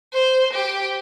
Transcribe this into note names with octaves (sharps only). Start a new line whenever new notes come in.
C5
G4